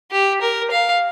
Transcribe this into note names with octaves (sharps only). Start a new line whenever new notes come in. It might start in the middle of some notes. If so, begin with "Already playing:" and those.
G4
A#4
F5